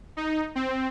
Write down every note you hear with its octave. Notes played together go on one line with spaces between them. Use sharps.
D#4
C4